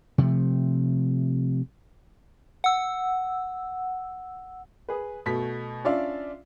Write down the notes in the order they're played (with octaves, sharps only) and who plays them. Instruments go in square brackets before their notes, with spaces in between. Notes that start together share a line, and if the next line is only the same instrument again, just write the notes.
[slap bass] C3 F3 A3
[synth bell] F#5 E6
[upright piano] G#4 B4
B2 A3 B6
C#4 D4 F4 D5 E5 F5